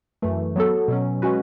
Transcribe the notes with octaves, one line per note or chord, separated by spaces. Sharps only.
F#2 E3 A3
F#3 B3 F#4 A4
B2 F#3 C#4
G#3 C#4 F#4 B4